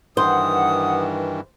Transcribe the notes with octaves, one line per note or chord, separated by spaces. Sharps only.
G2 D#3 E3 C5 F#5 D#6